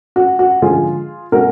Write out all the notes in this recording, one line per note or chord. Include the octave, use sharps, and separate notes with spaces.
F#4
F#4
D3 F3 G#3 F4 G#4
B2 G#3 F#4 A#4